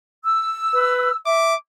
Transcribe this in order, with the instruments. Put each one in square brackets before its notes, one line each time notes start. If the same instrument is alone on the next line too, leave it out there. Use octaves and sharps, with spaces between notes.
[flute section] E6
[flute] B4
[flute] E5 [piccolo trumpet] D6